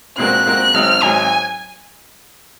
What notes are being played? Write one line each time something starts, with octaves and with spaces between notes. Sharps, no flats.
A#2 G#3 C4 F#4 A#4 F#6
A#2 G#3 C4 F#4 A#4
G#1 G#2 F#3 C4 D#4 F6
G#1 G#2 F#3 C4 D#4 G#5